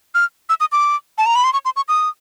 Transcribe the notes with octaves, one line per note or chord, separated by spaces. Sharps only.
F6
E6
D#6
D6
A5
A#5
B5
C6
C#6
C6
C#6
D#6